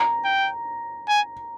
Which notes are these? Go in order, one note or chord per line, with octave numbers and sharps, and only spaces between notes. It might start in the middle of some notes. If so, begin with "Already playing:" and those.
Already playing: A#5
G5
G#5